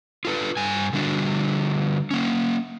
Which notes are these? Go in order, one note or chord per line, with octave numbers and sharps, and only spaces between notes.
F4 A4 B4
G2 G#5
D3 G3 D4 F#4
A#3 C#4